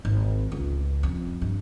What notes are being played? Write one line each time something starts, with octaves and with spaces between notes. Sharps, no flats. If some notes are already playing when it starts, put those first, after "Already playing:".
G#1
C#2
F2
G2